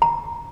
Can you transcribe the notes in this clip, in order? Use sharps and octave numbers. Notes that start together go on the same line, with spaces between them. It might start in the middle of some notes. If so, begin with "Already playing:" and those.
A#5